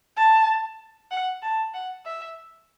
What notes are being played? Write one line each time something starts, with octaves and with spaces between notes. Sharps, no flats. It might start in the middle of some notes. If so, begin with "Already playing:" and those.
A5
F#5
A5
F#5
E5